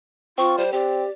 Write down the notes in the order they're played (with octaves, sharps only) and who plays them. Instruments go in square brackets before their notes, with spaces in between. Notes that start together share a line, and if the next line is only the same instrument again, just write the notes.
[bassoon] C4 [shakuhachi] F4 [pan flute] C#6
[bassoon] G3 [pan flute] C5
[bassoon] C4 [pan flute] G4 [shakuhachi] D5